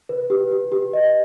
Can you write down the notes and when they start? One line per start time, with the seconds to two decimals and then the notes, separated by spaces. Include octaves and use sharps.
0.09 B4
0.30 G4
0.51 G4
0.72 G4
0.93 D#5